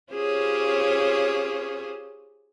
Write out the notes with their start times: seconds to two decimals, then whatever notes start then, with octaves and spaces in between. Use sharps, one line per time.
0.13 C#4 F4 G4 G#4 C5 C#5